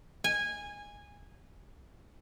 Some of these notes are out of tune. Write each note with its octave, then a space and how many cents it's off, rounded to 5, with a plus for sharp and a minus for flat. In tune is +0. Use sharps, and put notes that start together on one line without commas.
G#5 -15